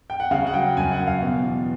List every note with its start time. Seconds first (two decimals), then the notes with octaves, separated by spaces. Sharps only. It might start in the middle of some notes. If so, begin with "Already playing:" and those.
0.10 G5
0.20 F#5
0.31 C#3 F5
0.47 F#5
0.54 F#3 G5
0.77 F#2 G#5
0.92 F#5
1.00 F#2
1.07 F5
1.22 B2
1.45 E2